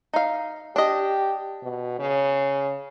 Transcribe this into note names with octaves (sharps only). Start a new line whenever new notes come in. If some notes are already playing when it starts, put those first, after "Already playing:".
D#4 F5
D4 G4 D#5
B2
C#3